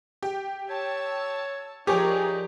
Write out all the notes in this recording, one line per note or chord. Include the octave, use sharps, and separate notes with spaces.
G4
C#5 A5 E6
F3 D#4 G4 G#4 A#4 C#5 D5 G#5